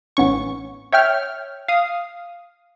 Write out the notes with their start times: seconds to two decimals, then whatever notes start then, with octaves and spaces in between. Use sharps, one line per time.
0.17 A1 B3 C#4 C#6
0.92 C#5 E5 G5 F6
1.68 F5 D#6